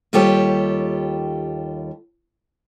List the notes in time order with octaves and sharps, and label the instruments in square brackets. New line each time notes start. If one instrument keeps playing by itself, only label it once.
[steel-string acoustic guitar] D#2 G3 F4 G4 A4 C#5